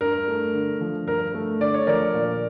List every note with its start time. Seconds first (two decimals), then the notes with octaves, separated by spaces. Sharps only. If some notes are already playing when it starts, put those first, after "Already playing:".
0.01 G2 A#4
0.28 A3
0.54 D3
0.81 F3
1.07 G2 A#4
1.34 A3
1.61 D3 D5
1.74 C#5
1.87 F3 A#4 D5
2.14 A#2